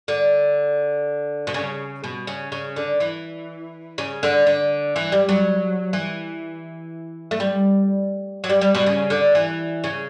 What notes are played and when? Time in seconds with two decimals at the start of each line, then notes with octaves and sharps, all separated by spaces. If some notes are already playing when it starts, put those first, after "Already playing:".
0.08 D3
1.47 B2
1.54 C#3
2.04 B2
2.27 C#3
2.52 C#3
2.76 D3
3.00 E3
3.98 C#3
4.23 D3
4.47 D3
4.96 E3
5.12 G3
5.29 F#3
5.93 E3
7.31 A3
7.40 G3
8.44 F#3
8.49 G3
8.61 G3
8.75 B2
8.86 C#3
9.10 D3
9.35 E3
9.84 C#3